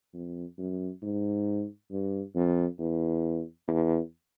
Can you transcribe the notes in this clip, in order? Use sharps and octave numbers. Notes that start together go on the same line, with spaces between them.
F2
F#2
G#2
G2
F2
E2
E2